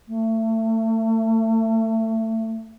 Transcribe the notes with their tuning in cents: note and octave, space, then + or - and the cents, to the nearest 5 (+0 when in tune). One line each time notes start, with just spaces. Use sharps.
A3 +25